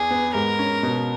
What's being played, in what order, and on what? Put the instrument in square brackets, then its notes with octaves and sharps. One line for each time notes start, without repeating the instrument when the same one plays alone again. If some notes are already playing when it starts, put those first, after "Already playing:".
Already playing: [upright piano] E2 [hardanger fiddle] G#4
[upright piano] B3
[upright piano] G#2 [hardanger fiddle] A#4
[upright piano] C#4
B2